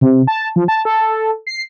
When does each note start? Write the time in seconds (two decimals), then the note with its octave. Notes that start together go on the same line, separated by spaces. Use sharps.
0.01 C3
0.27 A5
0.56 F3
0.68 A5
0.85 A4
1.47 C7